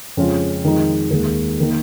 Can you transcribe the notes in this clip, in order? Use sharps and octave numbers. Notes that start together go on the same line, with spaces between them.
F2 C#3 G#3 C#4 F4
F2 D#3 G#3 D#4
D#2 D#3 G#3
D#3 A#3